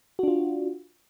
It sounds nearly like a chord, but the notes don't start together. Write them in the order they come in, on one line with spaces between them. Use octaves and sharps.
F#4 D4 F4